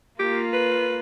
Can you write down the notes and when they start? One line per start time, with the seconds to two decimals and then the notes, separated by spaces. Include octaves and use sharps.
0.19 A#3 F4 G4
0.53 B4